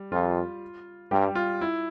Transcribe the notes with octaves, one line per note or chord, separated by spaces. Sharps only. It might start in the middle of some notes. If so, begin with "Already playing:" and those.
Already playing: G3
F2 F4
G2 G3 G4
F4
E4